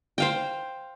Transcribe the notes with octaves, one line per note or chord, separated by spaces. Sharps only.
C5 F5 G5